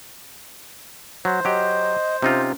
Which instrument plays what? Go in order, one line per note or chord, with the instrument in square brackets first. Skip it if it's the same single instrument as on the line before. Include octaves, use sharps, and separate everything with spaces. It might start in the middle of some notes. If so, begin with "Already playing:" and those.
[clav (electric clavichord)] F#3 [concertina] C5
[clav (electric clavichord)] F#3 G4 [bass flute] D#5
[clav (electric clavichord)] C3 D#4 F4 [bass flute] C#4